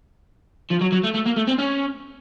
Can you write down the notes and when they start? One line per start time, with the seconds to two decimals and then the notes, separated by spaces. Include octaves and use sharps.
0.71 F3
0.81 F#3
0.93 F#3
1.04 A3
1.15 A3
1.26 A#3
1.37 A3
1.48 C4
1.59 C#4